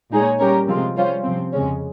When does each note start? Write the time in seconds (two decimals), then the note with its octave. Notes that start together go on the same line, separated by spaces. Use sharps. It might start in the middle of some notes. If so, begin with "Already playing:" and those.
0.11 A#2 G#3 D#4 G#4 C#5
0.39 G3 C#4 G4 A#4 C#5
0.67 C3 F3 G#3 C4 F4
0.96 G3 C#4 F4 C5
1.24 C3 F3 C4
1.53 F2 C#3 G#3 C#4